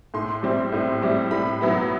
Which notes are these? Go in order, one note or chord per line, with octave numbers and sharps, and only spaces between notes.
A2 C6
G3 C4 E4
A2
G3 C4 E4
A2 B5
F#3 B3 E4